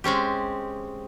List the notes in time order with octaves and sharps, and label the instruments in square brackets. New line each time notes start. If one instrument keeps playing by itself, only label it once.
[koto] G#3 C4 C#4 G4